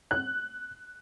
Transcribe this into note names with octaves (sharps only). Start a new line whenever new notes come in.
F#6